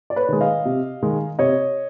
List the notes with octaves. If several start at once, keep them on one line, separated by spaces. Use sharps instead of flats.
D5
B4 C#5
D#3 G#3
D#5 F5
C3
D#3 G#3
C3 C#5 D#5